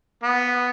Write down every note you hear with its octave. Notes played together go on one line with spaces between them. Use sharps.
B3